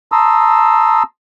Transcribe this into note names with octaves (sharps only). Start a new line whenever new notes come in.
A5 A#5 C6 D#6 E6